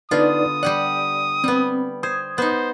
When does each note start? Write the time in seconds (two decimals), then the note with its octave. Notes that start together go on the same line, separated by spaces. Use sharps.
0.11 D3 B3 D#4 F4 B4 D5 D#6
0.63 G3 G4 D5 F#5
1.44 G3 B3 C4
2.03 C5 D#6 G#6
2.38 B3 D#4 C5